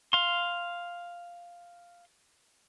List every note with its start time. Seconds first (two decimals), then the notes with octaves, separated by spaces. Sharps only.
0.13 F5 C6